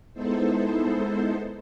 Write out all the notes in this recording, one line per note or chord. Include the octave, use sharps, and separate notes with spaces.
G#3 B3 D#4 E4 A4 C5